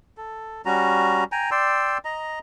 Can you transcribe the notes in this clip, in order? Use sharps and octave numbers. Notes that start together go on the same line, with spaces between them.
A4
G3 C#4 F#4 A#5
G5 G#5 A#5
D5 G5 C6 E6
D#5 A#5